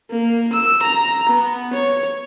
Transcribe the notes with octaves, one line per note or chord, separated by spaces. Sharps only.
A#3
E6
A#5
B3
C#5